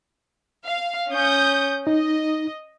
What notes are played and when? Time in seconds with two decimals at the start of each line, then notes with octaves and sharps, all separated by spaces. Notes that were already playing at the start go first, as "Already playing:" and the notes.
0.65 F5
1.10 C#4 D#6 G6
1.87 D#4 D#5